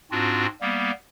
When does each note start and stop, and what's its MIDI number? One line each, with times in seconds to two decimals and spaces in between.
0.11 0.46 44
0.11 0.46 60
0.11 0.46 62
0.11 0.46 65
0.11 0.46 66
0.61 0.91 55
0.61 0.91 58
0.61 0.91 59